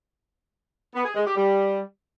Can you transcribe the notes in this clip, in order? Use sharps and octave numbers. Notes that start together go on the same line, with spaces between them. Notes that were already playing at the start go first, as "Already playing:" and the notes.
B3
G#4
G#3
G4
G3